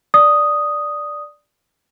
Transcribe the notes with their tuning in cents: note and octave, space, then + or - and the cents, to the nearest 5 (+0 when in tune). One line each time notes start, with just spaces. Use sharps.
D5 +0 D#6 +0